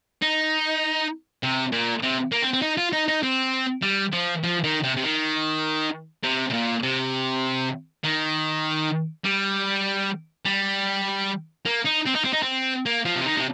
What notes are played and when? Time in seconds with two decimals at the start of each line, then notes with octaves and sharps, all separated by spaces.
0.22 D#4
1.43 C3
1.72 A#2
2.02 C3
2.32 A#3
2.42 C4
2.53 C4
2.62 D#4
2.78 F4
2.93 D#4
3.08 D#4
3.23 C4
3.82 G3
4.13 F3
4.44 F3
4.64 D#3
4.83 C3
4.97 C3
5.04 D#3
6.23 C3
6.50 C3
6.53 A#2
6.83 C3
8.04 D#3
9.24 G3
10.45 G3
11.65 A#3
11.85 D#4
12.06 C4
12.15 D#4
12.24 C4
12.33 D#4
12.43 C4
12.86 A#3
13.05 F3
13.15 C3
13.25 D#3
13.37 C3